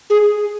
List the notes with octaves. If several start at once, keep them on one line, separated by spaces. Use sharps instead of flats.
G#4